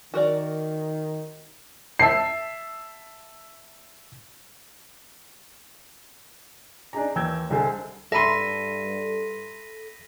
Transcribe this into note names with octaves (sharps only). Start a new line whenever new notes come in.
D#3 F#4 A#4 D5
E5 A5 C7
D4 D#4 G#4 A#5
D#2 E3 G5 E6 G6 G#6
C2 D3 G#3 A4 C5 G#5
G2 A4 E5 B5 C6 A#6 B6 D#7